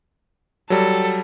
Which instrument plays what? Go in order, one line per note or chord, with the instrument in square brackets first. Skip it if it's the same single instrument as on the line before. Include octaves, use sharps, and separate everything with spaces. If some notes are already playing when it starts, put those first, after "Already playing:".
[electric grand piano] F#3 G3 [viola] A4